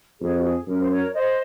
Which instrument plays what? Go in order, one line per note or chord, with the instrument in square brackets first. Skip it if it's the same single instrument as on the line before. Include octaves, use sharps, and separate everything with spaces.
[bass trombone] F2 [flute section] G#4
[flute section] F#4
G#4
[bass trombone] F#2 [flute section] A#4
[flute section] C5
A#4 C#5
C5 D#5